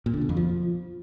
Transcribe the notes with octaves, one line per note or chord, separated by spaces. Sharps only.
A#2
D3
B2
F2
F3